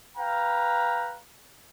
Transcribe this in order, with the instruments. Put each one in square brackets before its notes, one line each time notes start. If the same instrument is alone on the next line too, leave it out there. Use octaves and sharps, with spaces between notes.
[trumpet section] B4 F5 G5 A#5